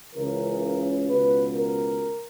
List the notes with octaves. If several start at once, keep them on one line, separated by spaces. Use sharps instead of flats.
C#2 C#3 E3 A#4
C#2 B2 B4
A#4